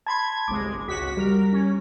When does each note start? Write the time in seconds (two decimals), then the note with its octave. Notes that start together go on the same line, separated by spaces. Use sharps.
0.06 A5 B5 C6 G#6
0.48 G1 C2 G#3 D6
0.88 C#2 F#4 B6
1.17 G3 A#4
1.52 C#4